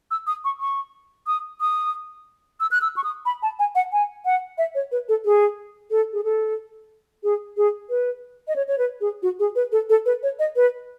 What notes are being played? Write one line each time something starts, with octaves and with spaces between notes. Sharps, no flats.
E6
D#6
C#6
C#6
D#6
D#6
E6
F#6
E6
C#6
D#6
B5
A5
G#5
F#5
G#5
F#5
E5
C#5
B4
A4
G#4
A4
G#4
A4
G#4
G#4
B4
D#5
C#5
C#5
B4
G#4
F#4
G#4
B4
A4
A4
B4
C#5
D#5
B4